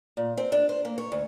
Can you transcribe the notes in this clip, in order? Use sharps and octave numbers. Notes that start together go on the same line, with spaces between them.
A#2
C4
D4
C5
A#3
C#5
D2